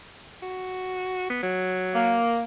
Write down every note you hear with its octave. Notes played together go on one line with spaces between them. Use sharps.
F#4
B3
F#3
A#3